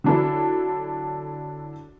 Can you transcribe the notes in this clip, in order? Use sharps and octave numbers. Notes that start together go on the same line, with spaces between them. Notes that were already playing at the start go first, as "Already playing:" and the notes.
D3 F#3 D4 E4 A4